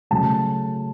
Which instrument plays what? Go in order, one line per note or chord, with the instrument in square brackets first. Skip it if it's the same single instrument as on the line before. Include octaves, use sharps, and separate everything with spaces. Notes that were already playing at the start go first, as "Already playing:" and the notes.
[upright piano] C#3 F#3 A3 A5